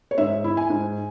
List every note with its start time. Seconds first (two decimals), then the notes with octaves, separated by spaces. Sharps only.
0.11 C#5
0.18 G#2 E5
0.44 E4
0.57 G#5
0.70 G#2